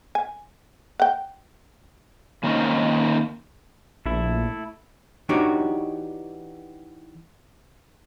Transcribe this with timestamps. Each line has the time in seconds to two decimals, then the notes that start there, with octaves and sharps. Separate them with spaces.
0.15 G#5
1.00 F#5 G5
2.43 D#3 A#3 C4 C#4 D#4
4.06 A#1 A3 E4
5.29 E3 D4 D#4 F#4 G4 C#5